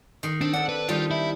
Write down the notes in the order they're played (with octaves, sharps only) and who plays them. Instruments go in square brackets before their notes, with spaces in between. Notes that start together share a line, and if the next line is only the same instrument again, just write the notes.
[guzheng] D#3 C6
[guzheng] C4 [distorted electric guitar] D4
[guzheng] D4 A4 [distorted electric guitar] F#5
[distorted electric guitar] B4
[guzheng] D#3 G3 [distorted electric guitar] F4
[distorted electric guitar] E4